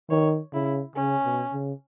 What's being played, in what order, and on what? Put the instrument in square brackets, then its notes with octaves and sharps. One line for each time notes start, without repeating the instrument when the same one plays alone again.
[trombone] D#3 [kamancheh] C#5
[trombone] C#3 [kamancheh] E4
[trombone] C#3 [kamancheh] C#4
[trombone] B2
C#3